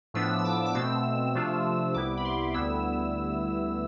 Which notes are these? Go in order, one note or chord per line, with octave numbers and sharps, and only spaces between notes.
A2 F3 B3 D4 E6
E6
D6
D6
B2 A3 C4 E6
C3 F3 A3 D4 F4
C2 C3 G3 B3 E4 D6
B5
C6
D2 D3 G3 B3 E4 E6